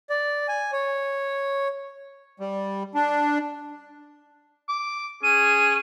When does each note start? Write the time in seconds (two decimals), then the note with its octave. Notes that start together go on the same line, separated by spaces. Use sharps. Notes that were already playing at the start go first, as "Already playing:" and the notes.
0.10 D5
0.48 G#5
0.72 C#5
2.40 G3
2.95 D4
4.69 D6
5.23 C#4 G#4 D#7